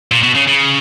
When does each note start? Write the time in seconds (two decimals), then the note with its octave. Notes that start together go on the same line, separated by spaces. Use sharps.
0.11 A#2
0.23 B2
0.35 C#3
0.47 C#3